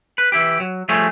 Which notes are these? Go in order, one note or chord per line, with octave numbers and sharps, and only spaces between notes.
B4
E3 E4 G4
F#3
F3 G3 A3 G#4 C#5